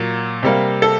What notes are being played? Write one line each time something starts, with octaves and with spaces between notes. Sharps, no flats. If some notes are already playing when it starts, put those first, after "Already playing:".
Already playing: A#2 F#3 A#3
C3 G3 A#3
A4